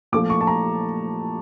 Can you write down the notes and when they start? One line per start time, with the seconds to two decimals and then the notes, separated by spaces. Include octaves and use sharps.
0.12 A#2 F3 A3 D6
0.30 C#6
0.41 A5
0.47 A#5